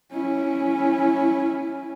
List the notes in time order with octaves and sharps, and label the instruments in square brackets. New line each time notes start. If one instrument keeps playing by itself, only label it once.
[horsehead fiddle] C#4 E4